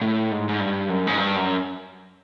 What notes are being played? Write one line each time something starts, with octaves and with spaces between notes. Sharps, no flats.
A2
G#2
G#2
G2
F#2
G#2
G2
F#2